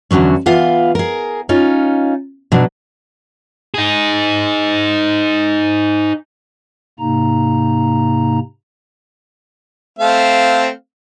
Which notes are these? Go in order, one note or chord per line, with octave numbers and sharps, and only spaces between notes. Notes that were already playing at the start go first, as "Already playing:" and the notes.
E2 G2 D3 F#3 C#4
E3 B3 F4 F5
G#4 A#4
C#4 D#4 F4
B2 F#3 D4
D#4 G#4
G#2 C3 A#3 D#4 A#5
A3 C4 F5